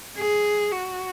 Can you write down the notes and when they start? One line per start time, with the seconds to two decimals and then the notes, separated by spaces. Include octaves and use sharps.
0.17 G#4
0.72 F#4